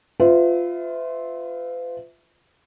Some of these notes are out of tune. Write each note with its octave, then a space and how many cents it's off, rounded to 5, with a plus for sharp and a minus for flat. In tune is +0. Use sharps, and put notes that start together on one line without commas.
F4 +0 B4 +45 E5 -10